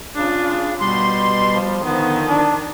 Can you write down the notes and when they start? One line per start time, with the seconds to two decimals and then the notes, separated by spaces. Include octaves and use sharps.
0.15 C#3 D4 F4
0.80 B2 G3 C6
1.50 F3
1.84 D3 D#3 F3 B3
2.29 D4